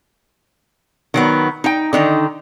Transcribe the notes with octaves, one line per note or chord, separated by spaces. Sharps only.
D#3 F#3 B3
D#4 G5
D3 D#3 D#4